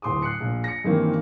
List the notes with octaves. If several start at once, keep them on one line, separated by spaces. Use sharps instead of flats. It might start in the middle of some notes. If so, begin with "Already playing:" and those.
D1 C6 D6 D#6
F#6 C7 C#7
A#1
A#6 C#7
G2 D#3 E3 A#3 C4